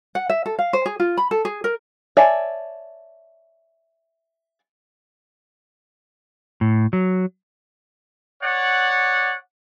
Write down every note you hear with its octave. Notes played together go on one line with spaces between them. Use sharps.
F#5
E5
A4
F5
C5
G#4
F4
B5
A4
G#4
A#4
C#5 D5 E5 G#5 A5
A2
F#3
C#5 D5 F#5